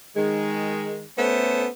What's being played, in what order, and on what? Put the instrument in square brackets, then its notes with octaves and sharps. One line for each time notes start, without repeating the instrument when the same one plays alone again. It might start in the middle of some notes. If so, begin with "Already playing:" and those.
[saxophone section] D#3 G#3
A3 B3 C#4 A4 C5 E5